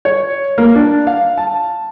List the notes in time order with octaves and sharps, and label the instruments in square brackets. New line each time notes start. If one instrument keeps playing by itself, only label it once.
[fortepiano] C#5
A#3
D4
F5
A5